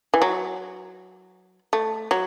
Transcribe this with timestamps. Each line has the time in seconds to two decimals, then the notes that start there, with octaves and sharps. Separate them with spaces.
0.14 E3
0.22 F#3
1.73 A3
2.11 F#3